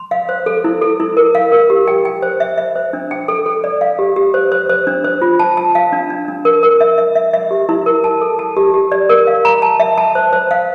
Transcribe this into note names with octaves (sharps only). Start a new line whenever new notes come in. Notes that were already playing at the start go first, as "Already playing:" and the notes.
Already playing: C6
F5
C5
A4
E4
A4
E4
A#4
F5
A#4
G4
G5
G5
C5
E5
E5
C5
D4
G5
A4
A4
D5
F5
G4
G4
C5
C5
C5
D4
C5
F4
A5
A5
F5
D4
D4
D4
A#4
A#4
E5
E5
E5
E5
G4
E4
A#4
A5
A4
A5
G4
G4
D5
A#4
F5
A#5
A5
E5
A5
C5
C5
F5